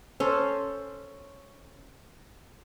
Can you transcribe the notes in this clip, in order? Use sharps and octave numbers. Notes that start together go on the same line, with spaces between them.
C#4 A4 C5